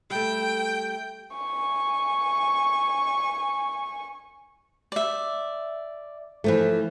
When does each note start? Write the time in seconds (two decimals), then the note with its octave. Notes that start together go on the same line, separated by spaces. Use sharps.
0.10 G3 A3 G5
1.36 G#5 C#6
4.92 D5 E5
6.44 E3 F3 A3